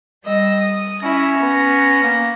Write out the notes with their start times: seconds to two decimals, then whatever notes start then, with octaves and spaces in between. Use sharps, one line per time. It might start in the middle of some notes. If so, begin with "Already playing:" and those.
0.24 G3 D#5 E6
0.60 D#6
1.03 C#4 E4 A#6
1.39 B3 A#6
2.03 A#3